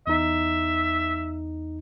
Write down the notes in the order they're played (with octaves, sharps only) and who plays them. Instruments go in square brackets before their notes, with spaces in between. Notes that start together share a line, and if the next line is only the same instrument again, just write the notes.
[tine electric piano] E2 D#4 [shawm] E5